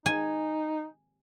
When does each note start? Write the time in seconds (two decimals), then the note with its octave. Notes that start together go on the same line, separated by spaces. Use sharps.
0.06 D#4 G#5